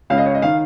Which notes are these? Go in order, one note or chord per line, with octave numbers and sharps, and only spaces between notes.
C#2 C#3 F5
D#5
C#5
D#5
D#3 F5